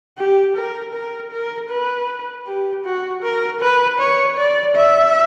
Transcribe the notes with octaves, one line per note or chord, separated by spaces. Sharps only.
G4
A#4
A#4
A#4
B4
G4
F#4
A#4
B4
C#5
D5
E5